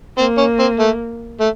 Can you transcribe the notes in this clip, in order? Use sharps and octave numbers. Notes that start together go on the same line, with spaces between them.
A#3 C4
C#4
C4
A3
A3